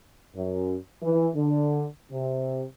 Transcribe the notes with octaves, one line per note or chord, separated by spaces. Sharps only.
F#2
E3
D3
C3